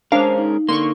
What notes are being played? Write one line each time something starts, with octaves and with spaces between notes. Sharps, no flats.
G#3 C#4 D4 A#4 C5 F5
D#4
D3 A#3 C6 C#6